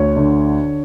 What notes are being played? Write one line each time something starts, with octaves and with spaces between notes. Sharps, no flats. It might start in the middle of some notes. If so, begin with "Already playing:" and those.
Already playing: D2 C#5
D3